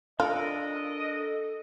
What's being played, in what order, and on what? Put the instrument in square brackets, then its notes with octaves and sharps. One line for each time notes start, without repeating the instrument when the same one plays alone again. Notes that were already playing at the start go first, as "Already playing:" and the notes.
[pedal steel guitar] D4 A#4 [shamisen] F4 [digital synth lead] A4 [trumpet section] D#5